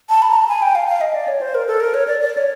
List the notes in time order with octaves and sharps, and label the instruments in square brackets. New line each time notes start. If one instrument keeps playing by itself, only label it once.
[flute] A5
B5
A#5
A5
G#5
G5
F5
F5
D#5
D5
C#5
C5
A#4
A4
A#4
C#5
D5
D5
C#5